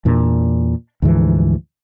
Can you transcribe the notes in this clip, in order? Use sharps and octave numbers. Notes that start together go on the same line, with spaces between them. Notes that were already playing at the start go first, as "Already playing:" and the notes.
E2 A#2 D4
D2 G#2 E3 F3